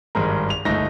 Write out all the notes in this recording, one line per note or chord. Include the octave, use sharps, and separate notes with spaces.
G#1 G2 G#3 A#4
F7
G1 C#2 A3 D#4 A#6